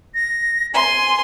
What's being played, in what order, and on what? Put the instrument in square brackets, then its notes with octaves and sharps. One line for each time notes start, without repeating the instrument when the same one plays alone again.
[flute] A#6
[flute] G#5 [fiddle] C6